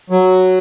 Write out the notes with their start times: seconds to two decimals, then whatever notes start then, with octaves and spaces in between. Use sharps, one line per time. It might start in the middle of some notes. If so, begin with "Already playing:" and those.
0.10 F#3